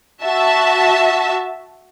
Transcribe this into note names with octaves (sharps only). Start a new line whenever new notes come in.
F#4 E5 A5